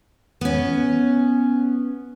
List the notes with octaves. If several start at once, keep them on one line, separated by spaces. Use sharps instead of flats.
B3 C#4